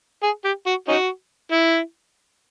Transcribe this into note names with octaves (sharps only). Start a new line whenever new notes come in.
G#4
G4
F#4
C#4 D#4 F#4
E4